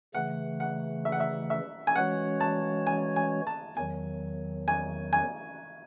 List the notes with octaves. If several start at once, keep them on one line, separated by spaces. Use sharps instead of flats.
C#3 E3 A3 F#5
F#5
E5
F#5
E5
E5
G#5
E3 G#3 C#4 F#4 C#5 F#5
A5
G#5
G#5
A5
E2 D#3 F#3 G#5
G#5
G#5